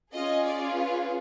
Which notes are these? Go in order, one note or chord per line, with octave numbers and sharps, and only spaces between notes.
C#4 F4 G#4 D#5
D5
B4